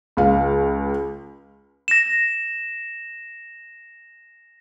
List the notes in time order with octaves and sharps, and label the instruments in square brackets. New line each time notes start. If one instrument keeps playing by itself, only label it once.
[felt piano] C#2 F5
[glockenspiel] A#6 E7